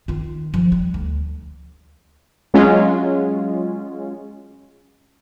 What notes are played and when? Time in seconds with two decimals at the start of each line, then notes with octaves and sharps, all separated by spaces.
0.08 D#3 F4
0.54 F3
0.72 G3
0.94 D2
2.54 F#3 G#3 C#4 F4